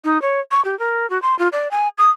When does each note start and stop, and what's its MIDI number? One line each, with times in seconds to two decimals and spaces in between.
0.04 0.20 63
0.22 0.40 73
0.51 0.64 85
0.65 0.77 67
0.79 1.09 70
1.10 1.21 66
1.22 1.37 84
1.39 1.48 65
1.52 1.70 74
1.71 1.88 80
1.98 2.10 87